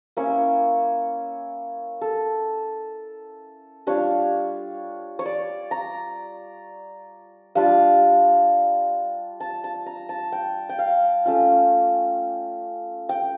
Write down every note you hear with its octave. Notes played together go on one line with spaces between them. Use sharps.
A#3 C#4 E4 C#5
A4
G3 D4 F4 C#5
C#5
D5
A#5
G3 D4 F4 F5
A5
A5
A#5
A5
G5
G5
F5
A3 C#4 F4
G5